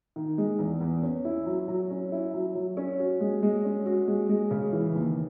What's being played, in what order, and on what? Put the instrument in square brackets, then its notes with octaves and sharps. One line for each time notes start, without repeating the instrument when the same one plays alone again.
[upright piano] D#3
G#3
E2
E2
C#4
E4
F#3
F#3
C#4
E4
F#3
F#3
C#4
F#4
G#3
G#3
C#4
F#4
G#3
G#3
C#3
E3
D#2